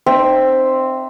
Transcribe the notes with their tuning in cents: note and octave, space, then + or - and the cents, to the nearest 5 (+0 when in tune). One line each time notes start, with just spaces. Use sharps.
C4 +0 D#4 -35 E5 +0